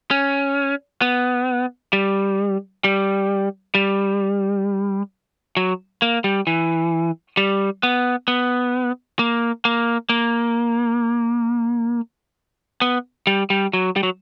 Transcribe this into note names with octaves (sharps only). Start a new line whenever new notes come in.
C#4
B3
G3
G3
G3
F#3
A#3
G3
E3
G3
B3
B3
A#3
A#3
A#3
B3
G3
G3
F#3
G3
F#3